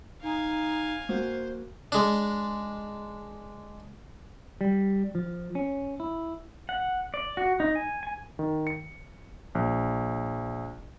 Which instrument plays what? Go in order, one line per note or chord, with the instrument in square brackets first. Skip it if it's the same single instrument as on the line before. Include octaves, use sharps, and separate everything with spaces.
[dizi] D#4 [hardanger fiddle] F5 G#5
[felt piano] A#3 F#4 [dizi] C5
[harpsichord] G#3 D4
[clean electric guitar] G3
F3
C#4
E4
[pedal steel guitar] F#5
D5
F#4
D#4
G#5
G#5
[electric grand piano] D#3
C#7
A#1